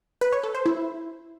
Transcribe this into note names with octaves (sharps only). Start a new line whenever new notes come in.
B4
C#5
A4
C5
E4